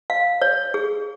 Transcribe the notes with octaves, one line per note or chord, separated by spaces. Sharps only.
F5
C#5
G#4